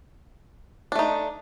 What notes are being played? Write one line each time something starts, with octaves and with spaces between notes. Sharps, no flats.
A3 D4 D#4